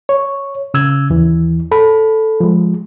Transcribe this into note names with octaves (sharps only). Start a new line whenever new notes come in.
C#5
C#3 E6 G#6
D#2 E3
A4 B5
F3 G#3